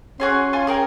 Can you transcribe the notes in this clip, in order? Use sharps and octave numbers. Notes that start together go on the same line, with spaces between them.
C#4 F#4 G#4 C6
F4 G#5 C6
G#4 A#4 G5